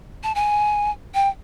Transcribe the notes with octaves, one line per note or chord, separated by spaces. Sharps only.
A5
G#5
G5